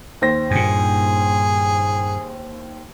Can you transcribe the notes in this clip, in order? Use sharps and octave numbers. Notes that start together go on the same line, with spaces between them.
D#2 C5 A#6
G2 A#2 G#4